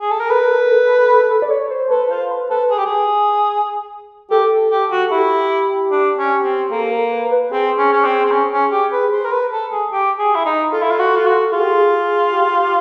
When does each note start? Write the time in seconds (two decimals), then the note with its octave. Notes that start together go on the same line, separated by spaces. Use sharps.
0.01 G#4
0.11 A4
0.20 A#4
0.30 A4 B4
0.40 A#4
0.51 A4
0.61 A#4
0.72 A4
1.10 A4
1.30 A4
1.42 D5
1.50 C#5
1.71 C5
1.90 A4 B4
2.10 F4 C5
2.31 B4
2.50 A4 B4
2.70 G#4
2.78 G4
2.86 G#4
4.31 G4 A4
4.71 G4
4.91 F#4
5.11 E4 G4
5.91 D4
6.18 C#4
6.44 C4
6.71 A#3 A4
6.92 A#4
7.12 B4
7.31 B4
7.51 C4 G#4
7.78 C#4
7.93 C#4
8.05 C4
8.26 C4
8.31 C#4
8.52 C#4
8.72 G4
8.92 B4
9.12 C5
9.24 A#4
9.32 B4
9.52 A4
9.72 G#4
9.92 G4
10.19 G#4
10.35 E4
10.46 D#4
10.72 F4 A4
10.82 E4
10.91 F4
10.99 F#4
11.16 F4
11.26 F#4
11.52 F4 G#4
11.62 G4
11.72 G#4
12.33 G4
12.52 G4